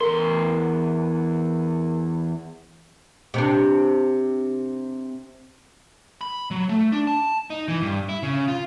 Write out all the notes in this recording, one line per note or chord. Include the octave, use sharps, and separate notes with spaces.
E2 A#4 C6
C3 D4
B5
F#3
A3
D4
A5
D#4
E3
G2
E4
C#3
F4